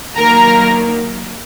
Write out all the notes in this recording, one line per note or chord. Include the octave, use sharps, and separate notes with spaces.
D#3 F#3 A#3 A#4 A#5